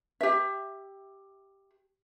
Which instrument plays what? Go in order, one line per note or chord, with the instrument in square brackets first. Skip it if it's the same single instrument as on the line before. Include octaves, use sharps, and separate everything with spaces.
[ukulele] G4 E5